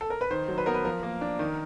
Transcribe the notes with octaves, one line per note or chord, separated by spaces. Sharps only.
A4
A#4
B4
D#3 C5
F#3
B4
B3 A#4
B4
F3 A#4
A#3
D4
D#3